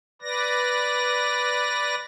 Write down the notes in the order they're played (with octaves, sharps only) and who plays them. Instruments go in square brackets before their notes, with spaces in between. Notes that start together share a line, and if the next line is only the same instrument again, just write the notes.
[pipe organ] B4 D5 A#6